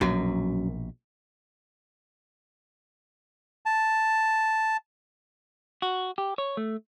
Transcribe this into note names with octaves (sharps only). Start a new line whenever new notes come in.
A#1 F#2 B2
A5
F#4
G4
C#5
A3